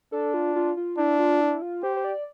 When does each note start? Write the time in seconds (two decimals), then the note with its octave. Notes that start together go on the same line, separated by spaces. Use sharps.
0.12 D4 A4
0.34 F4
0.56 F4
0.77 F4
0.98 D4 E4
1.19 F4
1.41 E4
1.62 F4
1.83 G4 C5
1.96 C5
2.04 D5